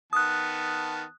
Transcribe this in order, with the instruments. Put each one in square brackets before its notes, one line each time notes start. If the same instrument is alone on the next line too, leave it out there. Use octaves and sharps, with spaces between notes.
[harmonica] D#3 B3 A5 [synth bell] D#6 F#6